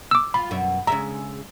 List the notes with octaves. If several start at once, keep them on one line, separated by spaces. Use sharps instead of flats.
D6 E6
F4 B5
F#2 B2 E5
C#3 G#3 E5 A#5